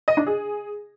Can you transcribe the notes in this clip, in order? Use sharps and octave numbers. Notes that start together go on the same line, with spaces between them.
D#5
D4
G#4